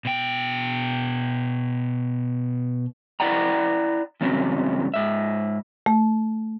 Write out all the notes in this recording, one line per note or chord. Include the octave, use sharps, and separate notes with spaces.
B2 G5
E4 D5 F#5 G5 A#5
E2 G2 C#3 F#3 C4
G#2 E5
A3